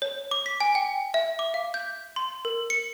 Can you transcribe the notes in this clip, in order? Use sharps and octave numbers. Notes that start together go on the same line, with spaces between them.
C#5
D6
B6
G#5
G5
E5
D6
F5
G6
C6
A#4
C#7